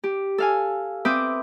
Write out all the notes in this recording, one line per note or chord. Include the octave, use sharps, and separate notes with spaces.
G4
A4 F5 G#5
C4 B4 E5 D6 D#6 G6